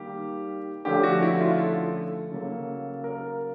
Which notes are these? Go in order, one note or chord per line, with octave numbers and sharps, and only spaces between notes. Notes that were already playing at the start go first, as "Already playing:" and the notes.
Already playing: D#3 G3 A#3 G4
D3 F3 A3 C#4 G4
F#4
E4
F4
A4
C#3 F#3 A#3
A#4